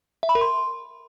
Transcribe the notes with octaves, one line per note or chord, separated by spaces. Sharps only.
E5
B5
A#4
C6